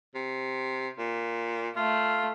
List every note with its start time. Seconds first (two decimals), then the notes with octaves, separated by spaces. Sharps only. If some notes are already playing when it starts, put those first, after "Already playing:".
0.15 C3
0.98 A#2
1.76 A3 F4